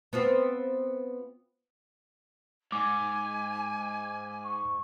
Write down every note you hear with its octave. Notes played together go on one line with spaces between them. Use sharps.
B3 C4 F4
G#2 G#5 D6
C#6